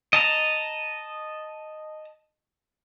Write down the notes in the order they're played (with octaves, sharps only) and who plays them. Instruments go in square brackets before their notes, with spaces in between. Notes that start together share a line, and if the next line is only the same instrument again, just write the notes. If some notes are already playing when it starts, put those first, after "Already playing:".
[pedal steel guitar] D#5 A5 A#5